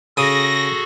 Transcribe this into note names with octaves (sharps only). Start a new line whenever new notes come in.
C#3 F#4 G#4 A4 D#6 A#6